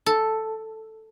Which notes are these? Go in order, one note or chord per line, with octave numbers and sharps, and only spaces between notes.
A4